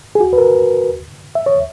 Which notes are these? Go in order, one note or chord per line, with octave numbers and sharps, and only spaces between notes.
G#4
F#4
B4
A#4
E5
C#5